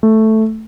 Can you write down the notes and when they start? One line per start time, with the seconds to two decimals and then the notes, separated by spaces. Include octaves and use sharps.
0.03 A3